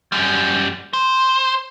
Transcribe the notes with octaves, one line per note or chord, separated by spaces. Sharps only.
F#2 G3
C5